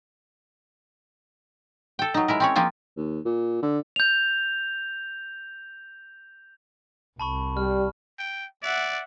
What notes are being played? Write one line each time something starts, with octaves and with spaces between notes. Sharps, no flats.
A4 G5
F#3 D#4
G#3 E4 A#4
C4 C#4 C#5
F3 A#3 C4 F4
D#2
A#2
D3
G6 F7
C2 A5 B5 C#6
G3 F6
G5
D5 E5 F#5